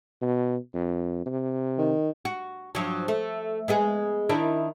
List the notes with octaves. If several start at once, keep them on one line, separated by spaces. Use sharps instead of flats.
B2
F2
C3
D#3
F#4
G2 F3 F#3
A3
G#3 B3 G#4
D#3 D4 E4